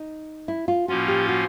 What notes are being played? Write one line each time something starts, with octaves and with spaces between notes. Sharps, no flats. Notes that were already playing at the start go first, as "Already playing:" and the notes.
Already playing: D#4
E4
F4
A2 F3 A#3 C#4 F4 F#4
G4
F#4